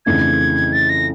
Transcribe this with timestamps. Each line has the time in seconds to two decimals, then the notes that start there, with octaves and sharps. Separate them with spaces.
0.06 F2 C#3 E3 A3 D4 G#6
0.72 A6
0.89 A#6